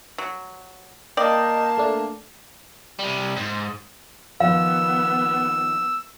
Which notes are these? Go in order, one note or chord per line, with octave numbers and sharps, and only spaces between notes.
F#3
A#3 D5 D#5 G5 A5
A3 D4
C3 G3
G#2
D#3 F3 B3 F5 E6